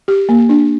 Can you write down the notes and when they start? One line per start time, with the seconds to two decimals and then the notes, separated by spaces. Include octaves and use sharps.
0.08 G4
0.29 A#3
0.49 D4